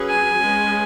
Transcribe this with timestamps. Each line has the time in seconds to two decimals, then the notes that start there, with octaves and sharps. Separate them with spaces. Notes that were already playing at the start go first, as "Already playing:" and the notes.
Already playing: F#3 C#4 G#4 B4
0.10 G#5
0.41 G#3 C#4 G#4 B4